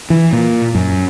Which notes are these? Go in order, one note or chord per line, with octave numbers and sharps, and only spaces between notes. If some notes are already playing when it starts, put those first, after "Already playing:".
E3
A#2
F#2